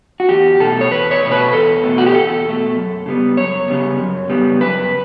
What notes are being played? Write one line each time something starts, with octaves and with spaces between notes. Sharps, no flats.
F#4
E2 G4
B2 A3 A4
C#5
E2 B4
C#5
B2 A3
B4
E2 A4
B2 A3
F#4
G4
E2 A4
B2 A3
F#2
C#3 G3 B3
F#2 C#5
C#3 G3 B3
F#2
C#3 G3 B3
F#2 B4